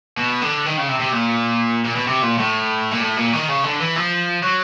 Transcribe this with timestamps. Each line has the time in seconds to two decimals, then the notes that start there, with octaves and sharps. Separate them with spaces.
0.17 B2
0.41 D3
0.66 D#3
0.77 C#3
0.88 C3
1.00 C3
1.12 A#2
1.85 A#2
1.96 B2
2.07 C3
2.22 A#2
2.38 A2
2.92 A#2
3.01 A2
3.17 A#2
3.33 D#3
3.49 C#3
3.64 D3
3.80 E3
3.96 F3
4.43 F#3